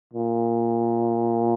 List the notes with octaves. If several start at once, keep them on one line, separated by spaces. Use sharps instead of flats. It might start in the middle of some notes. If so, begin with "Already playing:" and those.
A#2